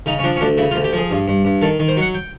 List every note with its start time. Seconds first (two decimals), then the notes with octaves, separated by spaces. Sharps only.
0.06 C#3 D#4
0.19 C#4
0.24 F3 D4
0.36 C#4
0.41 D2 D4
0.58 C#3 E4
0.71 F4
0.75 D2
0.84 G4
0.93 F3 G#4
1.10 G2
1.28 G2
1.45 G2
1.62 D#3 A4
1.80 D#3
1.88 C5
1.97 F#3 F#5
2.14 G5